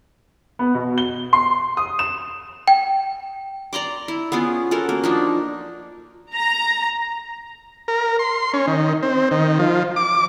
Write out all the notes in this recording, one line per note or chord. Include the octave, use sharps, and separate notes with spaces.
B3
B2
G7
C6
D#6
E7
G5
D5 A#5 C6 D6
E4
B3 C#4 F4 G#4
C#4 F#4 A4 A#4
A#3
F3 D4 D#4
A#5
A#4
C6
C#4
D#3
C4
D#3
F3
D6